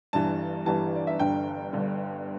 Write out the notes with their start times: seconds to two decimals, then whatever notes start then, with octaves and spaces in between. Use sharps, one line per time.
0.13 G1 G2 E3 G3 A5
0.66 G1 G2 E3 G3 A5
0.95 D5
1.07 E5
1.19 G1 G2 D3 G5
1.73 G1 G2 D3